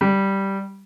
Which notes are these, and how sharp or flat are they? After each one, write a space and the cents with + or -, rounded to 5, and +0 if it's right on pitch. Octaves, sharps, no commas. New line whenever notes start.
G3 -5